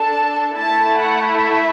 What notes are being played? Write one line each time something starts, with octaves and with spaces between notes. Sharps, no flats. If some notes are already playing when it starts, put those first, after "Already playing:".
Already playing: D4 A4 A5
A3 E4 A4 A5
F#5
E5